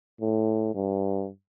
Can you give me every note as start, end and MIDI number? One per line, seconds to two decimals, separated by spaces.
0.21 0.73 45
0.74 1.29 43